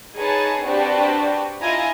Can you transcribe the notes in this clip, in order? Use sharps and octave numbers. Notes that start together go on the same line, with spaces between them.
D#4 G#4 B4 C#5 A5
C4 D4 F#4 G4 B4
E4 F4 D#5 G#5 A#5